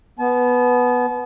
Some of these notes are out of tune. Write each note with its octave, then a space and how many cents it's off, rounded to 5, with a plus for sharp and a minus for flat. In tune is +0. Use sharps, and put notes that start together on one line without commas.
B3 +0 A5 -40